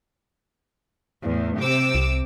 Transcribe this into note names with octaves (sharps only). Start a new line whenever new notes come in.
E2 A2
C3 D6 E6
C2